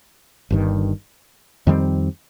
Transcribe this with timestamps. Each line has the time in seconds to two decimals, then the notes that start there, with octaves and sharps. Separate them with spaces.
0.50 G1 G2 D#3
1.67 F2 D#3 G3 C4